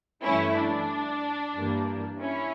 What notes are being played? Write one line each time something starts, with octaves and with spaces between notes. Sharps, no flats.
G2 E3 A3 C#4 E4
D4
G2 E3 G3 A#3
C#4 E4